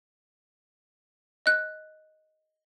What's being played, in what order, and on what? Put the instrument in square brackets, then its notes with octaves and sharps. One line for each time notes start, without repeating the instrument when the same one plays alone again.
[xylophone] D#5 F#6